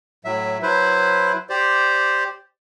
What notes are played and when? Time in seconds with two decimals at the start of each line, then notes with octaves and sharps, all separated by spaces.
0.25 A2 F#3 E5
0.62 F#3 E4 B4 C5
1.50 G4 C5 D5